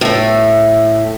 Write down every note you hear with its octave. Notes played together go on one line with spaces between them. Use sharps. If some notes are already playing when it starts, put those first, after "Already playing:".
A2 A3